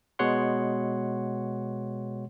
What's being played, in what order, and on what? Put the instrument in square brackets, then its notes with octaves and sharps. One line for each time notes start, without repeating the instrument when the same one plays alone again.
[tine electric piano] B2 G#3 C#5 F#5 C6